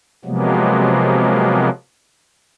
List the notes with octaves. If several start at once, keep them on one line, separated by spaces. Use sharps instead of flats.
C3 F3 F#3 G#3 A#3 B3